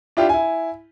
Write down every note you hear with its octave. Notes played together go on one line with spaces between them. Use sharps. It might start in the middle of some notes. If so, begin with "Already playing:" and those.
D4 E4 F4 G4
E4 G#5